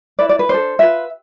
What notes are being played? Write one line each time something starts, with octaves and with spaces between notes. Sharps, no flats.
E4 B4 D5
D5
B4
D4 A4 C5
F4 B4 E5